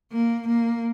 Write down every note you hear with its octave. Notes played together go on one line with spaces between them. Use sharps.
A#3
A#3